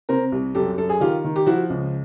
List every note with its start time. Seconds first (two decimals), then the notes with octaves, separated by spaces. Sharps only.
0.09 C3 A#4 C5
0.32 C2
0.55 F#2 G4 A4
0.78 F#2 A4
0.89 G#4
1.00 D#3 F4 G4
1.24 D#3
1.36 G4
1.47 F3 E4 F#4
1.70 C#2